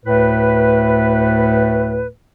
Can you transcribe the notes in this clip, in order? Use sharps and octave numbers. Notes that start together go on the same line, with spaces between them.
D2 A2 A3 B4